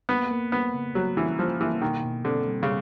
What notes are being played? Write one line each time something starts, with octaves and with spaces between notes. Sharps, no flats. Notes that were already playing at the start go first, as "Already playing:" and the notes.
A#3 B3
A#3
A#3 B3
C#3
F#3 A#3
E3 C#4
F3 A#3
E3 A#3
B2 D#3
B2
D3 C4
G3
C#3